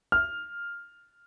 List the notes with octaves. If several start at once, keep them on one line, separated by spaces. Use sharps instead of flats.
F6